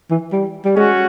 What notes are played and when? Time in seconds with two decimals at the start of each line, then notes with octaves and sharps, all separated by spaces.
0.11 E3
0.32 G3
0.65 G3
0.76 G#3 C#4 F#4